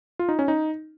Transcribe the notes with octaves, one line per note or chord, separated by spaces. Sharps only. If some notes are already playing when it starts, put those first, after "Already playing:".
F4
D#4
C#4
D#4